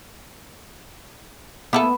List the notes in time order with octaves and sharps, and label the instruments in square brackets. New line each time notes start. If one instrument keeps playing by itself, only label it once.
[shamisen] A#3 E4 A4 [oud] B3